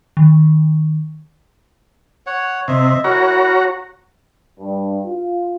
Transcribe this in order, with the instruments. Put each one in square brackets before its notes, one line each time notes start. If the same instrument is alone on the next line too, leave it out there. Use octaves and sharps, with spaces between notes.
[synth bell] D#3
[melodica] C#5 F#5
[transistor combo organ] C3 [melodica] D#5 E5
[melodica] E4 A#4 [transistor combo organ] F#4 C#5 A#5
[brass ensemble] G2
F4